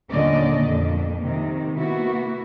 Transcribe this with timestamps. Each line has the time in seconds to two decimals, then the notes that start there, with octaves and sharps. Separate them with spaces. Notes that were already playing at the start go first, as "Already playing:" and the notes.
0.10 D#2 A#2 D3 C#4 D5 D#5
0.63 F2 A#3
1.21 C3 D#3
1.77 A#3 B3 E4 F#4